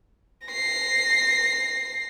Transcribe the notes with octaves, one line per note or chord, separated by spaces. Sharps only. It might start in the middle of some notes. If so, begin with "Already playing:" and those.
A#6 C7